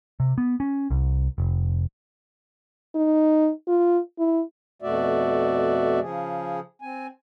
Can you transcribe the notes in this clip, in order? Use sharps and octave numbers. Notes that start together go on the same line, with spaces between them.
C3
B3
C#4
C2
F1
D#4
F4
E4
F2 B2 A3 F#4 D5 E5
C#3 F3 G#4
C4 G#5